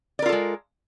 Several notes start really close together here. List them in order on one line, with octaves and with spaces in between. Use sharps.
D5 A#4 F4 A4 G#3